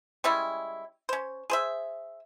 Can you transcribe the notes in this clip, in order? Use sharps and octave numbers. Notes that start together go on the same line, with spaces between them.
G3 G#3 C#4 E4
C#4 C5
G#4 C5 E5